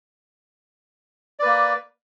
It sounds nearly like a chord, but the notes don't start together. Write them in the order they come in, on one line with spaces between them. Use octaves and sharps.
D5 B4 A#3